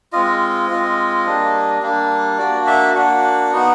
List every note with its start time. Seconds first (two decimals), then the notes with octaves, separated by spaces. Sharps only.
0.13 G#3 C4 F4 D#5
0.70 G#3 C4 F4
1.26 G3 A#3 D4
1.82 G3 A#3 D4
2.38 A#3 D4 F#4 D5
2.67 E5
2.95 A#3 D4 F#4 F#5
3.51 B3 D#4 F#4